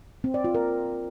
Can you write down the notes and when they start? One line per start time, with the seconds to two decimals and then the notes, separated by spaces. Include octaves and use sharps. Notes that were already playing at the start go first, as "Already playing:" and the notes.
0.24 C4
0.34 D5
0.44 F4
0.55 A#4